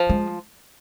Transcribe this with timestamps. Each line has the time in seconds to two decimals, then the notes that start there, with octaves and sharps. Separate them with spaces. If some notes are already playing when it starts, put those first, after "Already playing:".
Already playing: F3
0.10 G#3